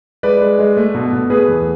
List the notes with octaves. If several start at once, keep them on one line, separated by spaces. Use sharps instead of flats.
G#3 B4 D5
G#3
G#3
A3
B2
B2
A3 G#4 B4
E2